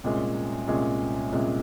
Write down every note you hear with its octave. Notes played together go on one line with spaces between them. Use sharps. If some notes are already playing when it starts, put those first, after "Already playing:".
C2 A#2 G#3 C#4
C2 A#2 G#3 C#4
C2 A#2 G#3 C#4